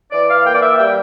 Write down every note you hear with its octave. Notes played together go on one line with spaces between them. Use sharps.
E3 D5
F5
A#3 G5
D5
E5
G3 G5